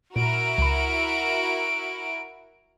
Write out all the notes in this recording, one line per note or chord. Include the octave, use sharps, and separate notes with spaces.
A#2 E4 F#4 A#4 D7
C#2 B5